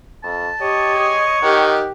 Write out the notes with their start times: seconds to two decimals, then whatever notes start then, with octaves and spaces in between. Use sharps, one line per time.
0.23 F2 A5
0.61 G4 C#5 D#5
0.95 G#4
1.43 D#3 G4 F#5